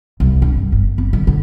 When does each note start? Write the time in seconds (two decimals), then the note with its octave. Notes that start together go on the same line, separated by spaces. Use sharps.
0.20 C2
0.42 D4
0.57 G2
0.72 G1
0.98 C4
1.13 D3
1.27 D3